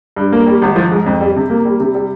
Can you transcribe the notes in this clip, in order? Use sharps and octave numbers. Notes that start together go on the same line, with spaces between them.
G2
A#3
G3
G#1
F3
G#2
F2
G3
C3
A#3
G3
C3
G3